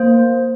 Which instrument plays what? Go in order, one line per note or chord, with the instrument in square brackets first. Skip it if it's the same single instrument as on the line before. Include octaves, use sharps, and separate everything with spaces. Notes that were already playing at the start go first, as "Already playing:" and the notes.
Already playing: [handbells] A#3 C5